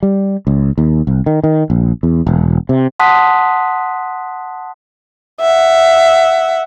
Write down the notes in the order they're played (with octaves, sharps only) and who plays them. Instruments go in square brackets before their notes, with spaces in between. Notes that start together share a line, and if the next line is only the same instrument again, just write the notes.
[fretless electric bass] G3
C#2
D#2
C2
D#3
D#3
A#1
E2
E1
C3
[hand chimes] F#5 A5 C6 D#6 F#6 B6
[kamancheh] E5 F#5